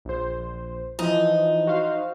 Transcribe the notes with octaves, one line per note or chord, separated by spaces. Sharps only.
A#1 C5
E3 F3 D#4
F#4 C5 F5